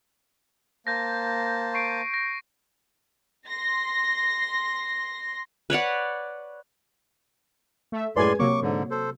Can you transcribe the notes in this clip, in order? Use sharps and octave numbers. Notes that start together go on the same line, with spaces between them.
A#3 C5 A5 G6 A#6
C#6 C7 D7
A#6
C6 A#6
B4 C#5 D5 F#5
A3 E5
F#2 A2 G#3 B4 D5 G#5 C6 G#6
C3 F#3 A#3 C#5 C#6 D6
G#2 D3
A4 C5